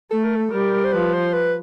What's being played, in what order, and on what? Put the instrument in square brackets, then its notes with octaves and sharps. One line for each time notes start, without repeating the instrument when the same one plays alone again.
[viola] A3 [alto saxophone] A4
[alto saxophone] A#4
A4
[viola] G3 [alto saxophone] A#4
[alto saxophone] C5
[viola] F3 [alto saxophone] B4
[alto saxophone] C5
B4